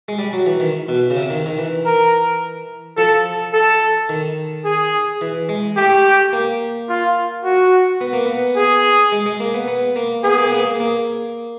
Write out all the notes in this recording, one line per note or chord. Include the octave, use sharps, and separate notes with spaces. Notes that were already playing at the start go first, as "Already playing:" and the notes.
G#3
G3
F#3
E3
D#3
B2
C#3
C3
D#3
D#3
E3
A#4
F3 A4
A4
D#3
G#4
E3
G#3
A3 G4
A#3
F4
F#4
B3
A#3
B3
G#4
G#3
G#3
A#3
B3
B3
A#3
B3 G#4
A#3
B3
A#3
A#3
A#3